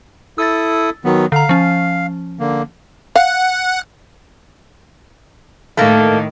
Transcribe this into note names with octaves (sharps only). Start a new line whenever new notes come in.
E4 A4 D#6 E6 A6
D#3 F#3 B3
D3 F5 A#5
F3 C#4
D3 A#3
F5 F#5
A2 D#3 A3 A#3